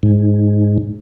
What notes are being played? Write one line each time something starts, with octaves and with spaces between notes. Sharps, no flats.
G#2